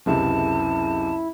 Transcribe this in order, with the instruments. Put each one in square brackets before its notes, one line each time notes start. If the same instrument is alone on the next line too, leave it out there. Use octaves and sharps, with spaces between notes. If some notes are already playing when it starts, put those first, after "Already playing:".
[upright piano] F#1 C#2 C3 [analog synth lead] E4 [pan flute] A5